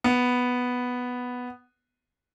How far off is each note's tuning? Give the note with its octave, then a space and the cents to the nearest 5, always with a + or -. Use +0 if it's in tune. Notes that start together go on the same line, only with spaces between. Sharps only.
B3 +0